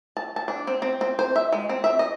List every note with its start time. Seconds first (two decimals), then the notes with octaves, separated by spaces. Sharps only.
0.17 A5
0.36 A5
0.48 D4
0.67 C4
0.82 C4
1.01 C4
1.19 C5
1.36 E5
1.52 G#3
1.69 C4
1.84 E5
1.99 D#5